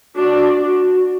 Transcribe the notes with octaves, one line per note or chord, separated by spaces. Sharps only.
D4 F#4
F#4